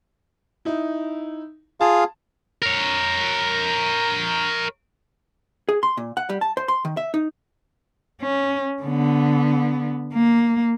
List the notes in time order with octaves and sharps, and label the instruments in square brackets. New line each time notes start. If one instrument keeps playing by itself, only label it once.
[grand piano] D#4 E4
[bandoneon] F4 G#4 F5 [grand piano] A5
[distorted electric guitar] A#4 C#5
[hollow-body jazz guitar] G#4
C6
A#2
F#5
G3
A5
C5
C6
D#3
E5
D#4
[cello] C#4
D3 B3
A#3